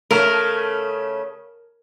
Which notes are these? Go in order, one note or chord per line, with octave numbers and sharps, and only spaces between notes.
C#3 A3 A#4